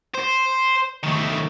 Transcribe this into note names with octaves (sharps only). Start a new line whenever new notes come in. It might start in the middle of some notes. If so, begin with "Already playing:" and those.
C5
D#3 A3